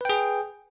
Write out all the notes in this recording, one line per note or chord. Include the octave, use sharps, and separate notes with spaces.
G#4 B4 G5